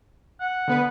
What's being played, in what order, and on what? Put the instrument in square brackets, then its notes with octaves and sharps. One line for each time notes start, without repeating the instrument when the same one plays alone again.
[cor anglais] F#5
[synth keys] D3 B3 B4